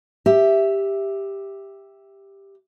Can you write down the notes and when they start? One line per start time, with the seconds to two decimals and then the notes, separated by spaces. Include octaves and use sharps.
0.26 G4 E5